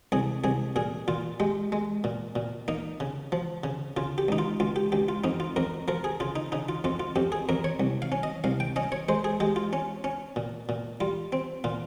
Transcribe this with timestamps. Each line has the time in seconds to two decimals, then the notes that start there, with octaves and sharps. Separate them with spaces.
0.12 C2 G#4
0.44 C2 G#4
0.76 A#2 G#4
1.08 A#2 F4
1.40 G#3 G4
1.72 G#3
2.04 A#2
2.36 A#2
2.68 A#3 D#4
3.00 C#3
3.32 F3
3.64 C#3
3.97 C#3 F4
4.18 G4
4.28 C#2 D#4
4.38 F4
4.60 C#2 F4
4.76 G4
4.92 C#2 G4
5.09 F4
5.24 F2 D#4
5.40 F4
5.56 F2 A#4
5.88 F3 A#4
6.04 G#4
6.20 C#3 F4
6.36 D#4
6.52 C#3 D#4
6.69 F4
6.84 F2 F4
7.00 F4
7.16 F2 G4
7.32 G#4
7.49 F2 A#4
7.64 C#5
7.80 C2
8.02 F5
8.12 C#4
8.23 D#5
8.44 C2 F5
8.60 G5
8.76 C#4 D#5
8.92 C#5
9.09 G#3 C5
9.24 G#4
9.40 G#3 G4
9.56 F4
9.73 C#4
10.04 C#4
10.36 A#2
10.69 A#2
11.01 G3 F4
11.33 C4
11.64 A#2 F4